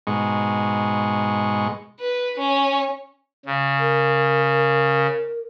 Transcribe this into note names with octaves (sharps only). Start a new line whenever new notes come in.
G#2 B2 G#3 C#6
B4
C#4
C#3
A#4